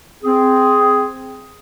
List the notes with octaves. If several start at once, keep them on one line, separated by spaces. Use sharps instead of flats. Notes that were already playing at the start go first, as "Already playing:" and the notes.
C4 G#4